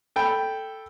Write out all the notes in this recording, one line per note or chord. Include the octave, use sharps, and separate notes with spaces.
A4 G5 B5